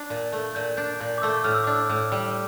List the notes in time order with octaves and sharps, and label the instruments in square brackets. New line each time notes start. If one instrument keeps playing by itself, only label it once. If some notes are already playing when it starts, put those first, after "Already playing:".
Already playing: [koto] D4
A#2
A3
[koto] A#2 [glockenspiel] G6
[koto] D4 [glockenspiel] G6
[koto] A#2 [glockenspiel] G6
[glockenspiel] D6
[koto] A3 [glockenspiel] E6
[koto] A2 [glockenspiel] F6
[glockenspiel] E6
[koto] D4 [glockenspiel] D6
[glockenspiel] E6
[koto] A2
G3